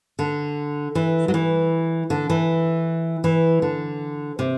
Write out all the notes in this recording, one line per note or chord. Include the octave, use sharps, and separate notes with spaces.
D3
E3
F#3
E3
D3
E3
E3
D3
C3